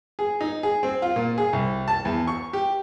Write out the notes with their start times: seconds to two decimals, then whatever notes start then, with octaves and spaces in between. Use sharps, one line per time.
0.19 G#4
0.41 D#4
0.63 G#4
0.83 C4
1.02 F4
1.16 A#2
1.38 G#4
1.53 C2
1.88 A5
2.05 E2
2.27 C#6
2.53 G4